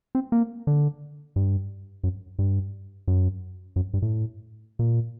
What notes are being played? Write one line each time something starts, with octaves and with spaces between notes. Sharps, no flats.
C4
A#3
D3
G2
F#2
G2
F#2
F#2
G2
A2
A#2